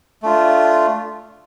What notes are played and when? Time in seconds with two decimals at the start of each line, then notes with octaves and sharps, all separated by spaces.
0.23 A3 D4 F4